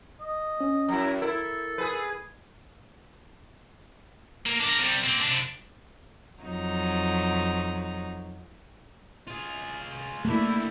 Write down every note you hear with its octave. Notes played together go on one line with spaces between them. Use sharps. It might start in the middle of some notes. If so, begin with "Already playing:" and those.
D#5
C#4
F#2 E4 A#5
E4 A4 A#4
G#4 B4
A#3 A#4
D4 A#4
C3 G3
A#3 C4
C3 D4
F2 F#3 D#4
F4 G#4
D3 G3 A3 A#3 E4